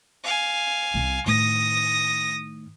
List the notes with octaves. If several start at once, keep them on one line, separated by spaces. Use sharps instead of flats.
F5 G#5
C2 C3
A2 D#3 D#6 A#6